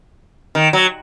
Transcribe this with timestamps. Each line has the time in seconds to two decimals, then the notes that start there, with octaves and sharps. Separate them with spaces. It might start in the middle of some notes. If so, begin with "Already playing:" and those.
0.55 D#3
0.73 F#3